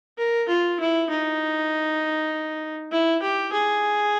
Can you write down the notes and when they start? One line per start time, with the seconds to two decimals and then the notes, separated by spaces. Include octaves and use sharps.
0.18 A#4
0.49 F4
0.80 E4
1.10 D#4
2.91 E4
3.22 G4
3.53 G#4